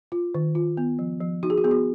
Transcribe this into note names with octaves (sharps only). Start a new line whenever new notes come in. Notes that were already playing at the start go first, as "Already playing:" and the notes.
F4
D#3
F4
B3
F3
F3
D#4 F#4
G#4
F#4
B3 G#4
F#4